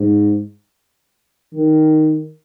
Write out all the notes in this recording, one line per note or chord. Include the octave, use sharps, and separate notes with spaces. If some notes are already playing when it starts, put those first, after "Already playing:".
Already playing: G#2
D#3